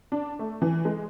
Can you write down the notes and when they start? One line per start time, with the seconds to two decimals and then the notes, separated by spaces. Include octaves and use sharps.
0.12 D4
0.39 A3
0.62 E3
0.85 G#3